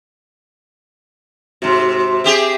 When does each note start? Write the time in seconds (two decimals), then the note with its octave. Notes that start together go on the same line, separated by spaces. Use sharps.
1.62 G#2 C3 F#4 C6
2.24 C4 G4 G#4 E5